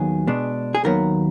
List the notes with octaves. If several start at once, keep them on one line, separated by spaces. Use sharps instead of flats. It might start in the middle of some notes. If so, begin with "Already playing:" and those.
Already playing: D#2 D#3 F#3 B3 G#4
B2 G#3 D4
G#4
D#2 D#3 F#3 B3 A#4